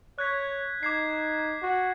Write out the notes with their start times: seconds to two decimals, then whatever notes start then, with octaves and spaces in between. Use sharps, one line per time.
0.19 C#5 F#6 G#6 B6
0.83 D#4 D6 G#6 C7
1.62 F#4